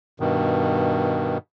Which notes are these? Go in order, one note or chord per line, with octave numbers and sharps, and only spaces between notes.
G2 B2 D#3